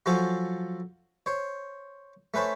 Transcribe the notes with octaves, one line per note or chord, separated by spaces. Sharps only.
F3 F#3 C#4 F4 A4 C5
C5 C#5
A3 C#4 B4 C5 A5